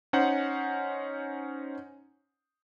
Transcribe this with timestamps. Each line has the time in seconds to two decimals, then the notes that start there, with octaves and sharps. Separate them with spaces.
0.13 C#4 D#4 C5 F#5